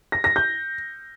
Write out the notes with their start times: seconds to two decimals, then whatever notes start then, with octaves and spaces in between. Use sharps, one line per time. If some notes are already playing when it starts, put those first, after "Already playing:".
0.12 A#6
0.24 A#6
0.36 G6